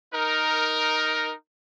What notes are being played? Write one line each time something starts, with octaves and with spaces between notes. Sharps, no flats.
D#4 A#4